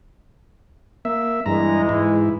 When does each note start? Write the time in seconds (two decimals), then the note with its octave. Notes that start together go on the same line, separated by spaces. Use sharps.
1.05 A#3 E5
1.46 G2 E3 G#3 A#5
1.89 G#2 E4